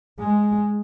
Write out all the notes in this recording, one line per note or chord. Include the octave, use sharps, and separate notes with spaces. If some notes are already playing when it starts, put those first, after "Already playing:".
G#3